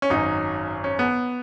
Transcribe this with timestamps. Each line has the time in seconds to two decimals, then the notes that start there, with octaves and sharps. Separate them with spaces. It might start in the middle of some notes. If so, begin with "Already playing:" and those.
0.02 C#4
0.10 G#1 F#2 F#3 D#4
0.84 C#4
0.99 B3